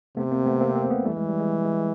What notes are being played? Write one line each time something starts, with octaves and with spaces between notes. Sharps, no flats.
C3 A3 B3
A#3 C4
A3 B3
A#3 C4
A#3 C4
A3 B3
E3 G3 A3
G#3
G3
G#3
G#3
G#3